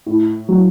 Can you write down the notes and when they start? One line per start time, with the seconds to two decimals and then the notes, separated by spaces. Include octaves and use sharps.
0.06 A2
0.49 F#3